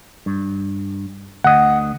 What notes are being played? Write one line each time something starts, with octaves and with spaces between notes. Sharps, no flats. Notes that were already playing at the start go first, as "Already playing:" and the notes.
G2
D2 D#5 F#5